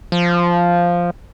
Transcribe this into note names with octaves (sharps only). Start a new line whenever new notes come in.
F3